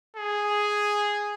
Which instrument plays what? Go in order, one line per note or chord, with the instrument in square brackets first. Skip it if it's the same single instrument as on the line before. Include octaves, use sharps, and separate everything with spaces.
[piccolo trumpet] G#4